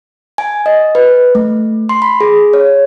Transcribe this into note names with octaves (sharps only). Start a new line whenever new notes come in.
G#5
D#5
B4
A3
C6
B5
G#4
C#5